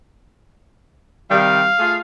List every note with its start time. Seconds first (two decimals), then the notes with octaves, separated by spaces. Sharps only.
1.31 C3 D#3 G3 F5
1.79 A3 F4 G#4